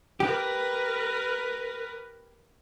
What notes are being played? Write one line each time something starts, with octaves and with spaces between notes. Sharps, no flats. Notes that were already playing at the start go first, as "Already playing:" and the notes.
G4 A#4 B4